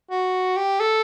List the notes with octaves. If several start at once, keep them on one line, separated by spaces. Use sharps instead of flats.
F#4
G4
A4